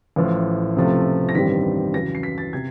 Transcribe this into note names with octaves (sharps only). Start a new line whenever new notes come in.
A1 A2 F3
C#2 C3 F3 A3
A#6
A1 G2 D#3 G3 C4 B6
E2 C#3 F#3 A#6
C7
B6
A6
C3 G#6